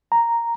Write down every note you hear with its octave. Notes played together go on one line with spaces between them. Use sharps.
A#5